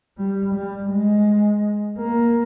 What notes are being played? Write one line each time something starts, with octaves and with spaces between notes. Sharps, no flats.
G3
G3
G#3
A#3